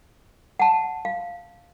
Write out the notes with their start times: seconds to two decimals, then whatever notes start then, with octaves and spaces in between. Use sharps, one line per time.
0.60 F#5 A5
1.05 F5